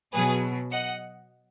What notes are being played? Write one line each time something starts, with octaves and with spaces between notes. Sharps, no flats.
B2 F#3 G#4 B4
D#5 F#5